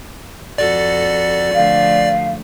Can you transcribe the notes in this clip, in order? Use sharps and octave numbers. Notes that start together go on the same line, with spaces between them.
F2 F#4 A4 D5
D3 F3 A3 F5